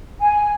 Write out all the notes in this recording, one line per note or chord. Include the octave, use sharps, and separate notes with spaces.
G#5